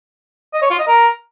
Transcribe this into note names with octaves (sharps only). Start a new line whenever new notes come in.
D#5
C#5
F4
D#5
A#4